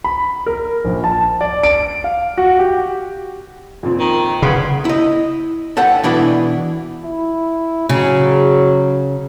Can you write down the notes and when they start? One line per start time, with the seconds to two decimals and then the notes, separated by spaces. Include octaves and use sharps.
0.04 B5
0.46 A#4
0.85 A#1
1.04 A5
1.41 D5
1.63 D7
2.04 F5
2.38 F#4
2.59 G4
3.83 F2 A#2 C4
4.00 D#3
4.42 C#3 B3 B5 C6 G#6
4.85 E4 D#5
5.77 A4 B4 F#5 G5
6.04 B2 E3 D4 E4 B4
7.04 E4
7.89 C#3 F#3